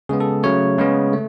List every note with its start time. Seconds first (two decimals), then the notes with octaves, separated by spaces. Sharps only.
0.09 C#3 G#3 B3 G#4
0.20 A4
0.43 C#3 F#3 A3 C#5
0.78 C#3 G#3 B3
1.13 A3